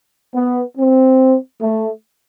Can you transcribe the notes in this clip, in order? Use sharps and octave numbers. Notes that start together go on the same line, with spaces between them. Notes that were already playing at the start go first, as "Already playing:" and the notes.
B3
C4
A3